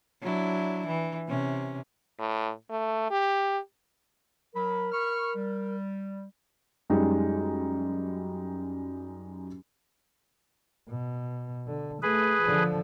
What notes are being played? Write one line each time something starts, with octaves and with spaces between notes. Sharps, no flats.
F#3 D4 E4
E3
C3 C#4
A2
A3
G4
F#3 A#4 B5
B5 C#6 F6
G3
F#2 G3 G#3 D#4
B2
D3
A3 G#4 B4
D3 F3